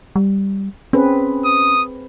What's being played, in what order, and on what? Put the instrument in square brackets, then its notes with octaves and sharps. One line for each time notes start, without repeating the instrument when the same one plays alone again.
[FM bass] G3
[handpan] C4 G#4 B4 [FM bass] C#4
[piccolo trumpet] D#6